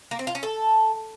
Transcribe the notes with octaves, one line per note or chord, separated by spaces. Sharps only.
A#3
C4
F4
C#4
A4